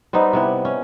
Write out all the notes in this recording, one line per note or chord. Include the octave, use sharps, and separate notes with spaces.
G3 B3 C4 D#4
C3 B3 E4
C#4